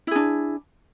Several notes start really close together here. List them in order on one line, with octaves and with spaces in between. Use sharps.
E4 G#4 D4